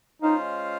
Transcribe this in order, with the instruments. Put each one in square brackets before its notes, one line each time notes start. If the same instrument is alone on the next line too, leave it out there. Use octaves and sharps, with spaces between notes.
[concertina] G#3 C#4 F4 C5 F5 [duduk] D#4